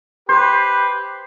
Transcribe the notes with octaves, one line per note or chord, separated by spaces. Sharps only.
G4 B4 C5